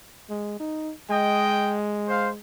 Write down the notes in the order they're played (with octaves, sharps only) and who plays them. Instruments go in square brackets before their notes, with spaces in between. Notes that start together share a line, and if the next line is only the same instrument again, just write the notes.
[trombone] G#3
D#4
[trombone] G#3 [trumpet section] D#5 G5
[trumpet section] C5 F5